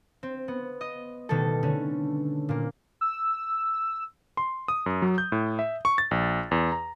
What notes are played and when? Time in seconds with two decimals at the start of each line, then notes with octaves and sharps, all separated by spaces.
0.23 C4
0.48 B3
0.81 D#5
1.29 B2 D#3 G3 A3 A4
1.63 D3 A3 C#4
2.49 A#2 A#3
3.01 E6
4.37 C6
4.68 D#6
4.86 F#2
5.02 F#3
5.18 G6
5.32 A2
5.59 E5
5.85 C#6
5.98 A6
6.11 A#1
6.51 E2
6.72 A#5